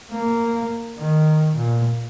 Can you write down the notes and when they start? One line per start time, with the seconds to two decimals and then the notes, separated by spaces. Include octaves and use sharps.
0.11 A#3
0.98 D#3
1.56 A#2